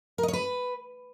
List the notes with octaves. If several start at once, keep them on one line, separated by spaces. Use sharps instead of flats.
A#4
D#5
C#5
B4